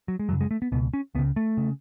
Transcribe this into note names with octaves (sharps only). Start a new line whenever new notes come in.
F#3
G#3
F#2 C#3 F#3
G#3
A3
B3
C#2 B2 B3
C#4
C#2 C#3 B3
A3
C#3